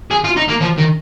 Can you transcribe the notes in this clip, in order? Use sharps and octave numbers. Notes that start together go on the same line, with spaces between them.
G#4
F4
D#4
A#3
F3
D#3